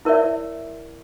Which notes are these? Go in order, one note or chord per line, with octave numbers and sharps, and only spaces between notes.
E4 A#4 C#5 D5 E5